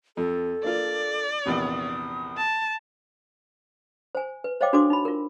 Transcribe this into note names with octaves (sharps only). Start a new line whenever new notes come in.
F2 A4
A#3 D4 F4 D5
A#1 E2 C3 D#6
A5
C5 G#5
B4
C5 C#5 D#5 F5 G5 D6
D4 F#4 A4 C5 C6 D6
D#4 B5
F4 A#4